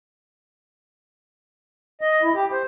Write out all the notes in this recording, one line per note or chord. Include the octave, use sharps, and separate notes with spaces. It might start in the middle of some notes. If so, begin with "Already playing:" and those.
D#5
E4
G4
C5